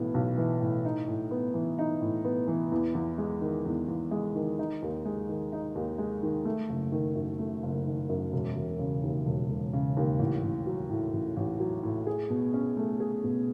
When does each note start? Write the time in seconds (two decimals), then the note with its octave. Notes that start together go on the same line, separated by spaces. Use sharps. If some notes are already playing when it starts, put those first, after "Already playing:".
Already playing: B1 A2 E3 B3
0.14 B1
0.38 E3
0.60 A2
0.85 D#4
1.08 A2
1.31 B3
1.54 E3
1.79 D#4
2.02 A2
2.25 B3
2.48 E3
2.72 E2
2.95 E2
3.18 G#3
3.41 D#3
3.66 E2
3.88 E2
4.11 G#3
4.35 D#3
4.59 D#4
4.82 D#2
5.05 G#3
5.29 D#3
5.52 D#4
5.75 D#2
5.98 G#3
6.23 D#3
6.45 A3
6.69 F#1
6.92 D#3
7.15 F#2
7.39 A3
7.63 F#1
7.86 D#3
8.09 F#2
8.33 E1
8.56 E1
8.79 C#3
9.03 D#2
9.26 E1
9.49 E1
9.73 C#3
9.97 D#2
10.19 A1
10.43 A1
10.66 F#3
10.90 A2
11.13 A1
11.36 A1
11.60 F#3
11.83 A2
12.07 G#4
12.30 B2
12.54 C#4
12.77 A3
13.00 G#4
13.24 B2